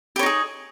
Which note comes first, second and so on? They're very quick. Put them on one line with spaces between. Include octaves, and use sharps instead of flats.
G4 C#5 D#4 G#4